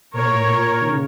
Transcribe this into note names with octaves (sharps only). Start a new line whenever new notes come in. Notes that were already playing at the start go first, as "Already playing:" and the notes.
A#2 A#4 C#5
A2
A#2
A#2
D#3
C#3